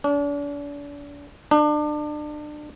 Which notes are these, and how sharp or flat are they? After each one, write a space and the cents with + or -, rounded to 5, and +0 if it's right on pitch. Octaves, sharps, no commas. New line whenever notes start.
D4 -40
D4 +30